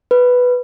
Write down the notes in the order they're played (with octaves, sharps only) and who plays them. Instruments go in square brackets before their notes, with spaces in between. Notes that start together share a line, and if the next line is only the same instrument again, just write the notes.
[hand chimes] B4